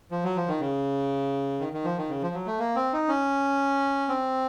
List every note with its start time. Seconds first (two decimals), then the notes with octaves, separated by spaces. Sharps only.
0.11 F3
0.24 F#3
0.36 F3
0.48 D#3
0.60 C#3
1.60 D#3
1.73 D#3
1.84 F3
1.98 D#3
2.09 C#3
2.22 F3
2.34 F#3
2.46 A3
2.59 A#3
2.75 C4
2.93 D#4
3.08 C#4
4.09 C4